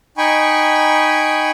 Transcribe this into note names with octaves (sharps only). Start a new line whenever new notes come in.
D#4 G5 G#5 B5 C#6